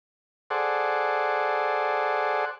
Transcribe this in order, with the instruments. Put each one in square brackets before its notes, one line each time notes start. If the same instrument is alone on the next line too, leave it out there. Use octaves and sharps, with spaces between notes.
[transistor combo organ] G#4 A4 C5 D5 F#5